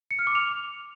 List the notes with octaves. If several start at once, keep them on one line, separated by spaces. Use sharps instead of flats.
C#7
F6
D6
F7